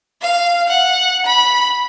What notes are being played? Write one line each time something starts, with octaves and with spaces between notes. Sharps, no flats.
F5
F#5
B5